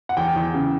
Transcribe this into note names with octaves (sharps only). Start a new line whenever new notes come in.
F#5
E2 G5
E2
C#3